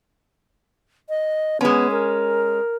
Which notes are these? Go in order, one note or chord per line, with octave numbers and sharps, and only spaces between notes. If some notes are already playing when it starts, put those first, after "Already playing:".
D#5
G#3 B3 C#4
A#4